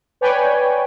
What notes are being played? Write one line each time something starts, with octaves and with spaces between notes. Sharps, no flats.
B4 C#5 D5 G5 G#5